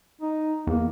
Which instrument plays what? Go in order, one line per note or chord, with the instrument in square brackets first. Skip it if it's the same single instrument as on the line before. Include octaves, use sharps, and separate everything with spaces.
[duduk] D#4
[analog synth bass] E2 [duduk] A#3